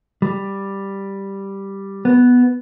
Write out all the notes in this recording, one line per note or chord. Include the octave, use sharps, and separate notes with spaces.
G3
B3